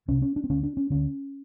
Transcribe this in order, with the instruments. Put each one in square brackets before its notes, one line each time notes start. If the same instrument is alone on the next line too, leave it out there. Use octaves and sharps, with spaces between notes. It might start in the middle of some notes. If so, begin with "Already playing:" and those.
[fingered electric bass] C2 C3 C#4
C#4
D4
C4
D2 D3 C#4
D4
C#4
D2 D3 C#4